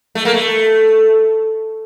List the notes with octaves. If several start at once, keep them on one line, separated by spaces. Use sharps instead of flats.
A3
A#3
A3